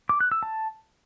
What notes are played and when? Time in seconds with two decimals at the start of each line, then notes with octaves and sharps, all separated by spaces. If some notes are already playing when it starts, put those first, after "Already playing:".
0.09 D6
0.20 F#6
0.32 E6
0.43 A5